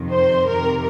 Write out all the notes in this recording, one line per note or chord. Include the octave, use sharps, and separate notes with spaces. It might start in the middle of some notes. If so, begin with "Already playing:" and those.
Already playing: F2 C3 D#3
C5
F2 C3 D#3 A#4